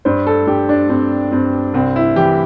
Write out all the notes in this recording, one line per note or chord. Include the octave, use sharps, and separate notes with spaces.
G2 C5
A4
G2 G4
D4
G2 C4
G2 C4
C2 C4
E4
E3 G4